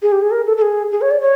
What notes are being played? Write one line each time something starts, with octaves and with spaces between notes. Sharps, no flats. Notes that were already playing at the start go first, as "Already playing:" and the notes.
G#4
G4
G#4
A#4
A4
A4
G#4
G#4
C#5
D5
C#5